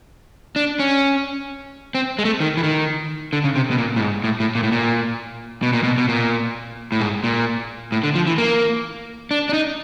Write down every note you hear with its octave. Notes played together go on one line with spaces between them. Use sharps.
D4
C#4
C4
G#3
A3
D#3
E3
D#3
D3
C#3
C3
B2
A#2
A2
G#2
A2
A2
A#2
A2
A#2
B2
A#2
B2
B2
A#2
A2
G#2
A#2
A2
D3
F3
E3
A#3
D4
D4
D#4